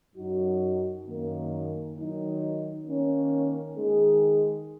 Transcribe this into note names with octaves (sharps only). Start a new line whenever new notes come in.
F#2 F#3 D#4 F#4
F#2 D#3 A#3
D#3 F#3 D#4
D#3 A#3 C#4
D#3 G#3 D#4 G#4